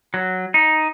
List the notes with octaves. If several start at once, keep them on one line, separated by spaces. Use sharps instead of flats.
F#3
D#4